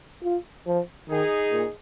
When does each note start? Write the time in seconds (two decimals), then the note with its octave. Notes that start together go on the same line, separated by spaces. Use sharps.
0.24 F4
0.66 F3
1.09 D#3 D#4 G#4
1.51 A#2